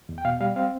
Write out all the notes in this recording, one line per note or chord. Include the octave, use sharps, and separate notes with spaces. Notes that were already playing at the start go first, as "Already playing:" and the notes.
E2
G5
B2 F5
G3 F5
C4 F5